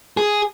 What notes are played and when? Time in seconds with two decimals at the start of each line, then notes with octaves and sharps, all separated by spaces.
0.17 G#4